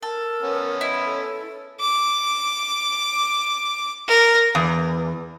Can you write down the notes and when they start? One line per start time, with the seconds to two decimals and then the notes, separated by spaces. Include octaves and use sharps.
0.02 A4 A#4
0.43 B3 C#4
0.81 E4 D#5
1.06 A4
1.80 D6
4.08 A#4
4.55 E2